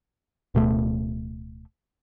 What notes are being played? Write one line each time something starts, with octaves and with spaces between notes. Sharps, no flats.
D1 B2 A3